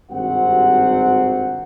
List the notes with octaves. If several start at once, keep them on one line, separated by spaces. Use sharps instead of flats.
G#1 G2 C3 C4 F#4 F#5